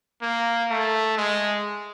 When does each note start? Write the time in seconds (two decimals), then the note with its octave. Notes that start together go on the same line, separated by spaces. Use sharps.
0.22 A#3
0.69 A3
1.17 G#3